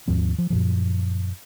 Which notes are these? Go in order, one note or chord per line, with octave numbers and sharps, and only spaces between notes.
D#2 G#2 F3 C4
F3
F#2 A#2 F3